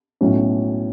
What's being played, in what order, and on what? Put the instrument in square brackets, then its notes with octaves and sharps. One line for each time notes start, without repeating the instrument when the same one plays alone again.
[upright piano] B1 A2 F#3 C#4